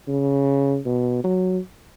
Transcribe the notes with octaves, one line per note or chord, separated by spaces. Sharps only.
C#3
B2
F#3